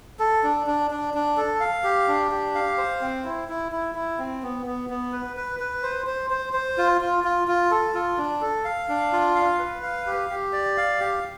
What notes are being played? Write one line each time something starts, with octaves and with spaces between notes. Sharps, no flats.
A4
D4
D4
D4
D4
A4
F5
G4
D4
G4
F5
C5
C4
E4
E4
E4
E4
C4
B3
B3
B3
B4
B4
B4
C5
C5
C5
C5
F4
F4
F4
F4
A4
F4
D4
A4
F5
D4
F4
F5
B4
F5
G4
G4
D5
F5
G4